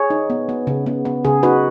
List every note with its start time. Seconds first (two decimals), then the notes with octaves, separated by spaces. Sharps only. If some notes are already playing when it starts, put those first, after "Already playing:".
Already playing: G#4 C#5
0.10 D#4
0.30 B3
0.49 B3
0.67 C#3
0.86 B3
1.05 B3
1.25 C#3 G#4
1.43 D#4 F#4 B4